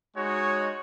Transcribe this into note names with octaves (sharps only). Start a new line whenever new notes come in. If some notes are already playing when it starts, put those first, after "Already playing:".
G#3 D#4 F#4 C#5